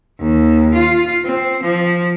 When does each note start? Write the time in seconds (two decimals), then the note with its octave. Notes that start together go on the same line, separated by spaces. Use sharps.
0.20 D#2
0.74 F4
1.25 C4
1.63 F3